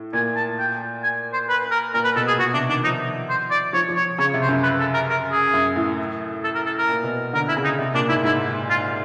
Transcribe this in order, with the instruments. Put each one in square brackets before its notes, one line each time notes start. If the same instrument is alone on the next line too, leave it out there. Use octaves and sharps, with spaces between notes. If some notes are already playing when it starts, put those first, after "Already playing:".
Already playing: [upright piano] A2
[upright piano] A#2 [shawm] G#5
[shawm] A5
G5
G#5
C5
B4
A#4
[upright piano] A#2 [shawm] A#4
[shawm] B4
[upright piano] B2 [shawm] A4
[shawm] G#4
[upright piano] B2 [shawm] F#4
[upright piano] C3 [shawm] D4
[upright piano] D#3 [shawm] D4
[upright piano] F3 [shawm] D#4
[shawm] C5
D5
[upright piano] F3 [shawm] C#5
[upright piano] F3
[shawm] C#5
[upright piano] C#3 [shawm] C#5
[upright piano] C3
[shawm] C5
[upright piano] F#2
[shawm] B4
A4
A#4
A#4
G#4
[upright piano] F#2
A2
[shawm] A4
A#4
A4
A#4
[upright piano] A#2
B2
[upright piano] D3 [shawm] A#4
[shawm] E4
[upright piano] C#3
[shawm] D#4
[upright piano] C3
[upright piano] A#2 [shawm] D4
[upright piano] G#2 [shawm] E4
[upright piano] G#2 [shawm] E4
[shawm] F4